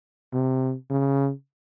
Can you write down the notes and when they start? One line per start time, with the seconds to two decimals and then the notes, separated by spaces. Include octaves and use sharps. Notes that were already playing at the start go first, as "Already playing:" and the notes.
0.34 C3
0.90 C#3